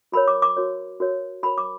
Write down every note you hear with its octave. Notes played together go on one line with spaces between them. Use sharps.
F#4 A#4 C#5 B5
D6
D6
F#4 A#4 C#5
F#4 A#4 C#5
F#4 A#4 C#5 B5
D6